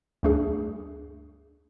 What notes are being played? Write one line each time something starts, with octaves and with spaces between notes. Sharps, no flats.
D2 G2 A3 D4 G#4